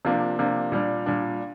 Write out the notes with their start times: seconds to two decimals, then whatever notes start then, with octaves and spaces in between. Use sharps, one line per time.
0.05 C3 F3 A#3 D4
0.39 C3 F3 A#3 D4
0.72 A#2 G3 D4
1.06 A#2 G3 D4